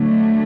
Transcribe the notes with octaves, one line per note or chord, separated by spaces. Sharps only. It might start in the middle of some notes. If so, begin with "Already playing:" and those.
Already playing: D3 F#3 A3